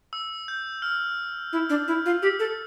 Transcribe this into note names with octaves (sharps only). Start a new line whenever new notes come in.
E6
G6
F6
E4
D4
E4
F4
G4 E6
A4